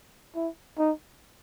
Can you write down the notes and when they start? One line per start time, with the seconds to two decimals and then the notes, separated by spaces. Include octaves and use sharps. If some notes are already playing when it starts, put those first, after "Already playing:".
0.35 E4
0.78 D#4